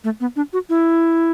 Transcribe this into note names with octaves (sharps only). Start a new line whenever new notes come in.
A3
B3
D4
F#4
E4